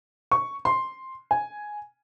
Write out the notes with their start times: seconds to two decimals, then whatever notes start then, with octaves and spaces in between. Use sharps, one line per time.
0.31 C#6
0.65 C6
1.31 G#5